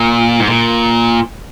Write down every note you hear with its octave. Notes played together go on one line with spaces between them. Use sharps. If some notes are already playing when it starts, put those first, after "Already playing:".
Already playing: A#2
G#2
A#2